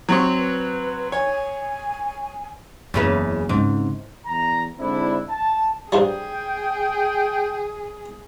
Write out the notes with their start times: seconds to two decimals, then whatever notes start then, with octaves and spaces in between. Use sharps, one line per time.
0.09 F#3 C4 C#6
0.38 B4
1.12 C#5 G#5
2.94 F#1 E2 C#3 B4
3.49 G#2 C#3 C4
4.27 E2 A#5
4.79 G#2 D3 C4 D4 E4
5.30 A5
5.92 G2 F3 F#3 G#4 G5